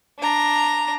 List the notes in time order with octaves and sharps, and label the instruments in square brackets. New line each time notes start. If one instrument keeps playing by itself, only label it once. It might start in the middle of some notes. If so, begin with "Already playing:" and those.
[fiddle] D4 A#5